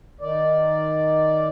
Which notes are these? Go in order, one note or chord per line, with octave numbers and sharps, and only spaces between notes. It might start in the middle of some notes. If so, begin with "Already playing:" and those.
D#3 D5